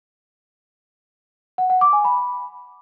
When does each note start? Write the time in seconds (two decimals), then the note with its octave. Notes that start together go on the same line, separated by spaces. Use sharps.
1.58 F#5
1.70 F#5
1.81 D6
1.93 G#5
2.05 B5